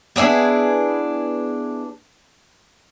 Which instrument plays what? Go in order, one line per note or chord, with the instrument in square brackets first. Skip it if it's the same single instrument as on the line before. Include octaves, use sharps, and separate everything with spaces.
[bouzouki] B3 D4 E4 G#4